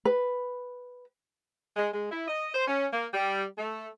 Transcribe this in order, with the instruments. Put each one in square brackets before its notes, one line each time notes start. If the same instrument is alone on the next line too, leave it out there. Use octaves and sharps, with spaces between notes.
[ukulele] B4
[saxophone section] G#3
G#3
E4
D#5
C5
C#4
A#3
G3
A3